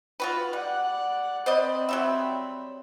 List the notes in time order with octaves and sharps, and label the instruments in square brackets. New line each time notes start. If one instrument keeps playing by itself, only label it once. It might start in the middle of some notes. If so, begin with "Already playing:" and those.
[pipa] F4 F#4 B4
[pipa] G3 [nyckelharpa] D5 F#5
[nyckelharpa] C4 B5 [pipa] C5 D5 D#5
[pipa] F#3 G3 E5